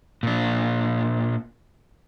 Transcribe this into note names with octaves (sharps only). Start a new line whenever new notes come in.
A#2 D4